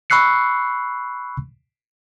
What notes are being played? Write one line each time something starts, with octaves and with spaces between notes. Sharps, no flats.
B5 C#6 E6 F#6 C7 C#7